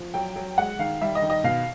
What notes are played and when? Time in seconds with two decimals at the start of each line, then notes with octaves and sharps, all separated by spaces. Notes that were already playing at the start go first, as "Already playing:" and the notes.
Already playing: F3
0.14 F#3 G5
0.36 F#3
0.58 G#3 F#5
0.79 D#3 F5
1.01 G3 E5
1.15 D#5
1.22 D#3
1.30 D#5
1.44 B2 F5